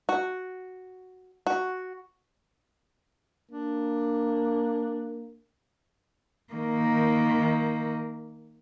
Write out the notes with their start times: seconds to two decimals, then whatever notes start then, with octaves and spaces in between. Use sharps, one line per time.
0.09 F#4
1.47 F#4
3.51 A#3 D4
6.53 D#3 A#3